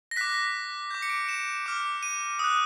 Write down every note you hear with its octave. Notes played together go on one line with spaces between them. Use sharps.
A#6
D6 F#6 B6
D6 G6
C#7
D7
E7
D6 F6
D#7
D#6 F#6